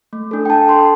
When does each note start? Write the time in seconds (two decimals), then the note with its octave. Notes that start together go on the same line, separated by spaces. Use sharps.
0.13 A3
0.31 D4 A4
0.46 G5
0.49 D4 A5
0.68 A4 C6